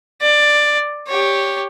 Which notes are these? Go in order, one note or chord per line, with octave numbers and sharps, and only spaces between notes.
D5
G4 C#5